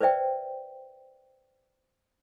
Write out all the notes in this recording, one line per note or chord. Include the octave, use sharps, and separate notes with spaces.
B4 C5 D5 E5 G5